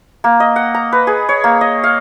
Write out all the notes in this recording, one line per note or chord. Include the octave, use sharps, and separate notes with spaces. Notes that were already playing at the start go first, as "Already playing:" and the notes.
A#3
D#5
F#5
A#5
B4
G#4
C#5
A#3
D#5
F5